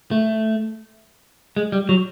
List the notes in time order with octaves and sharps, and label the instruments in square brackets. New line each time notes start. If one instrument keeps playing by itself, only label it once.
[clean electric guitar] A3
G#3
G3
F#3